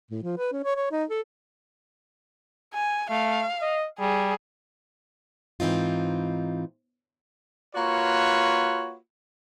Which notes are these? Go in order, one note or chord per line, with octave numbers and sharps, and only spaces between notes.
A2
F3
B4
C#4
C#5
C#5
D#4
A4
G#5
A3 F5
D#5
G3 G#4
G#2 E3 C4 D#4 F4
A#3 F4 F#4 B4 C#5